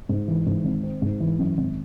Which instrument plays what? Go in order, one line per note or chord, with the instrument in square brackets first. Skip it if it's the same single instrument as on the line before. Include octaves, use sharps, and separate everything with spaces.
[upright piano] G#2
E3
G#2
G#1
C4
G#2
E3
F#2
G#1